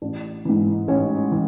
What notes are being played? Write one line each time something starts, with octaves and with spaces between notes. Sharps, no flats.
A1 D4
G#2 E3
A1 C#4
E3